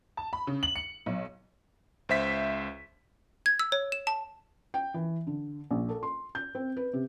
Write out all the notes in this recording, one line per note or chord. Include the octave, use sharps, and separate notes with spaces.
A5
B5
C#3
F#7
C#7
B1
C#2 C5 E5 B6
G#6
E6
C#5
E7
A5
G5
E3
D3
A#1
A4
C6
G6
C4
B4
C3